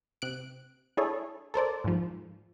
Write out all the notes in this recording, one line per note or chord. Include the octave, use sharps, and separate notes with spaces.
C3 F#6 D7
D4 E4 G#4 A4 C#5
A4 A#4 C5 D5
G#2 F3